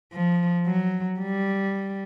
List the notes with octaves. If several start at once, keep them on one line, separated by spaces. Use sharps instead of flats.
F3
F#3
G3